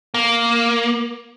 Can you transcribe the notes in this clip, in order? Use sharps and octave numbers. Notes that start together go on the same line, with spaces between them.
A#3